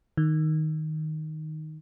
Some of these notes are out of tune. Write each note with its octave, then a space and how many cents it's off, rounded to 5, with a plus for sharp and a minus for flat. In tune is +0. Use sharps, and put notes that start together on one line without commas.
D#3 +0